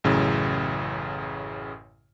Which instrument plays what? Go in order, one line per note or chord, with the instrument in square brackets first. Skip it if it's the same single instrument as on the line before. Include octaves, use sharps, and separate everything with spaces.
[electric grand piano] A1 F#2 A2 C#3